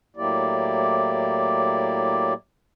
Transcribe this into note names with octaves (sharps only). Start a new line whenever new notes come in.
A2 F#3 A#3 E4 G4 D5